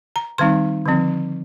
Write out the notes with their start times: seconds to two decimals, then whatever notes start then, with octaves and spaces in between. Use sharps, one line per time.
0.16 A#5
0.38 D#3 G3 C4 D#4 C6
0.86 D3 F3 C4